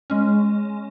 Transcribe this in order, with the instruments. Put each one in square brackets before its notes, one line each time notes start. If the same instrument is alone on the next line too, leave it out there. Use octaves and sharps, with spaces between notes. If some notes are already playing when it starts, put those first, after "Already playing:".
[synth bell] G#3 C#4